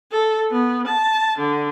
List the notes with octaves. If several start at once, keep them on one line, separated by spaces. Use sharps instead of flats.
A4
B3
A5
D3